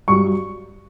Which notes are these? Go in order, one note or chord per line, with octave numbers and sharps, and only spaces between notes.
G2 F#3 C#6